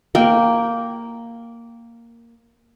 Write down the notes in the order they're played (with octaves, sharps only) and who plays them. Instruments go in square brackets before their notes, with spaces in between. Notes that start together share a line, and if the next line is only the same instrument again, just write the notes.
[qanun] A#3 G5